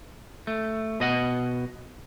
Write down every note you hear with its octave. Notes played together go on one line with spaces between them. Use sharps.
A3
B2 D#5 F#5